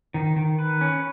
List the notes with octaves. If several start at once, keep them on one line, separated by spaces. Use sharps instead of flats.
D#3
D#3
B4
C#4